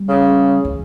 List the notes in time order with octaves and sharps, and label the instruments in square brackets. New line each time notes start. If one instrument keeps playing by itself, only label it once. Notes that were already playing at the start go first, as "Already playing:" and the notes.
Already playing: [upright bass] G3
[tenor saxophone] C#3
[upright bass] E3